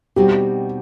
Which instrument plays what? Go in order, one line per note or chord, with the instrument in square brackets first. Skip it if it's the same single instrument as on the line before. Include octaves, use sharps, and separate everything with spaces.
[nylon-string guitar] B2 G3 C4 D#4 F#4 [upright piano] G4